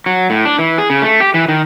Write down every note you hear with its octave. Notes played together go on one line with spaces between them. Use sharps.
F#3
A2
D4
E3
G#4
C#3
A3
G4
E3
D#3